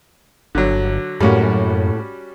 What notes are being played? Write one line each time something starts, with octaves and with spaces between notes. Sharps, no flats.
G1 D3 F#3
F#2 A2 G3 A#3 C#4 F#4